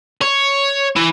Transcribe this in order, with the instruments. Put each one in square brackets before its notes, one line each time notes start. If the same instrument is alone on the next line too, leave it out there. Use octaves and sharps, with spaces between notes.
[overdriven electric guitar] C#5
E3